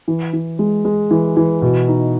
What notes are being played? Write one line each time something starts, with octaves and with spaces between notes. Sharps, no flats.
E3
E3
G#3
G#3
E3
E3
B2
D#4